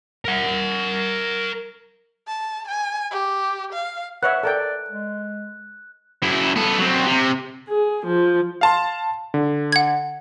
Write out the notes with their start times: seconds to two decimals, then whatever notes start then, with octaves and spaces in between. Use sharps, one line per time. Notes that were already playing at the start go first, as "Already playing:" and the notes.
0.25 A#4 F#5
2.28 A5
2.68 G#5
3.11 G4
3.73 F5
4.23 B4 C#5 E5 F#5 F#6
4.43 A4 A#4 D5 G5
4.90 G#3
6.23 F#2 E4
6.56 B3 A4
6.79 F#3 C4
7.06 C3
7.69 G#4
8.06 F3
8.61 F5 A5 C6
9.34 D3
9.72 F#5 G#6